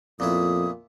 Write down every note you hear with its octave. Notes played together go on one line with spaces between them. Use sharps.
F2 A#2 B3 E4 D#6